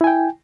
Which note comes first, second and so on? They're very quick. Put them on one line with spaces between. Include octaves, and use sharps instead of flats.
E4 G#5 G5